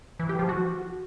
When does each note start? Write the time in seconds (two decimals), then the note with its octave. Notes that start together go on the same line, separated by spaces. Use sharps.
0.19 E3
0.29 G4
0.39 F3
0.49 F#4